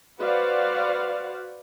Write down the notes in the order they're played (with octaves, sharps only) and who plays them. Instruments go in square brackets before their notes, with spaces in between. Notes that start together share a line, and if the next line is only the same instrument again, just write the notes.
[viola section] F#4 B4 C5 D5 F5 F#5